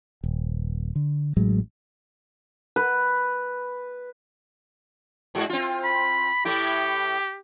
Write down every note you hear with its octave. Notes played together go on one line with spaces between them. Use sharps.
D#1
D3
A1 A2 F#3 G#3
B4
G#2 G#3 F#4
C4 F4
B5
A2 A3 E4 G4